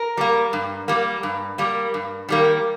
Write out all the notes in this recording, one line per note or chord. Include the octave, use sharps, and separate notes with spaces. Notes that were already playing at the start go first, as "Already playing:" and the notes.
Already playing: A#4
G3 A#3
G2
G3 A#3
G2
G3 A#3
G2
D#3 G3 A#3